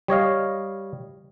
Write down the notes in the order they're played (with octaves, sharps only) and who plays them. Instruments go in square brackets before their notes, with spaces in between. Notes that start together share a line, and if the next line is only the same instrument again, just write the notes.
[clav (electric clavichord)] G3 C#5 D#5 F5